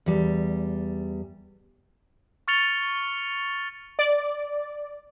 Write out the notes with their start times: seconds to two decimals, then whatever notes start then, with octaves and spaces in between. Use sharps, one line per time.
0.06 E2 G3
2.48 C#6 F6 A6 C#7 F7 G7
3.99 D5